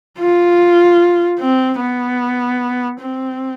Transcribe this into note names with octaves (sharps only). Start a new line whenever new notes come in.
F4
C4
B3
C4